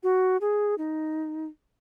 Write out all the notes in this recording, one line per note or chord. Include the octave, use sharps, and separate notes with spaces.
F#4
G#4
D#4